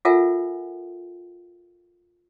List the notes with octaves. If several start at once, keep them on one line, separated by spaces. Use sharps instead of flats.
F4 A4 A#4 E5 F#5 G#5